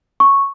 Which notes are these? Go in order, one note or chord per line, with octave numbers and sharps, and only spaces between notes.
C#6